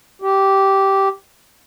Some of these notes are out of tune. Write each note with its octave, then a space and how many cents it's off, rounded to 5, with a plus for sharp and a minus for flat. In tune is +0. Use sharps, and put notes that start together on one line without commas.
G4 -10